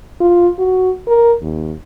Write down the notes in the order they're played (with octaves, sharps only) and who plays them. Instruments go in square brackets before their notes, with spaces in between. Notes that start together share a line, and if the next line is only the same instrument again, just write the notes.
[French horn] F4
F#4
A#4
D#2